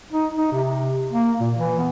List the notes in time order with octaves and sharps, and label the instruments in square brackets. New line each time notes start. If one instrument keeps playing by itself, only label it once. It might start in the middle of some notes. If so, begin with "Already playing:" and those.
[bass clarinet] D#4
D#4
C3
A#3
A#2
E3
B3